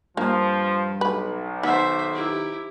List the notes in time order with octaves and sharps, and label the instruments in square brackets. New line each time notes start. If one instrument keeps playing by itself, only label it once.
[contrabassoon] G2 [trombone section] F3 [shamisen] A#3
[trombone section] B1 [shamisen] B4
[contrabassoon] D#3 [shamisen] B3 [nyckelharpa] C5 E5
[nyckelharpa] E4 G4